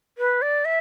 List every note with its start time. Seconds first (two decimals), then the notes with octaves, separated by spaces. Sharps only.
0.18 B4
0.42 D5
0.65 E5